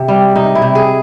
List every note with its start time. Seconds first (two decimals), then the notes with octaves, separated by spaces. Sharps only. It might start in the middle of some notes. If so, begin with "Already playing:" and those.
Already playing: C3
0.08 G3
0.35 C3 D#4
0.55 E4
0.62 C3
0.75 G#4